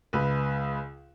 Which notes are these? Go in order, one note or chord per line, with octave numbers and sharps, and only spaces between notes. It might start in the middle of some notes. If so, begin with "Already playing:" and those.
C#2 B4